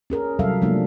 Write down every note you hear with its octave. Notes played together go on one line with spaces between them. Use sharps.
C#4 G#4 A#4
C3 F#3 G3 A4 E5 F5
C3 F3 G3 A3 A#3 D4